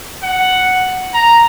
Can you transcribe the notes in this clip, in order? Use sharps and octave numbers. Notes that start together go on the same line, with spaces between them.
F#5
A#5